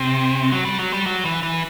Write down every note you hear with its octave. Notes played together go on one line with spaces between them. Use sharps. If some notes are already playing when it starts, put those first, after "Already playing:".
Already playing: C3
F#3
G3
F#3
G3
F#3
E3
E3